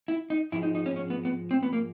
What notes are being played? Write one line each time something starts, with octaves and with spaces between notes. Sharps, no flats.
E4
D#4
G#2 F3 G#3 E4
D#4
D#4
C#4
C#4
B3
B3
C4
B3
A#3